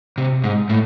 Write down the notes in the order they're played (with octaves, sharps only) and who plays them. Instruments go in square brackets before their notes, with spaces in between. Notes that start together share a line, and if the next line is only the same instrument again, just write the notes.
[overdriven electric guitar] C3
G#2
A2